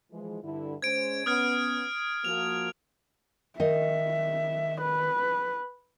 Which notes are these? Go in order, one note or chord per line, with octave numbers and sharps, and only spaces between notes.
E3 F3 G#3
G2 D3 E4
G#3 C#4 C5 G#6 D7
B3 C#4 D#6 F6 G#6
F3 A#3 F#4 F7
D#3 D#5 E5
B4